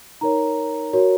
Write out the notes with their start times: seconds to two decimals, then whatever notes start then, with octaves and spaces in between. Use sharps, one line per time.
0.21 D#4 A#4 C#5 A#5
0.93 F#4 A#4 C#5